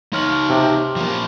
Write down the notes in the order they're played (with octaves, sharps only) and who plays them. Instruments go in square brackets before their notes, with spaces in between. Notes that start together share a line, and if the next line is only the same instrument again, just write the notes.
[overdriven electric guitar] D#4 C#5 [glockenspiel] C6 F6 F#7
[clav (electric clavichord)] C3
[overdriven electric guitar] F3 A#3